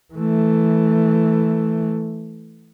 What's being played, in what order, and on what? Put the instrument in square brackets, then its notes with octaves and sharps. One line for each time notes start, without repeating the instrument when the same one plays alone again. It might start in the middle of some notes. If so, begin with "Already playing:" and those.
[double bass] E3 A3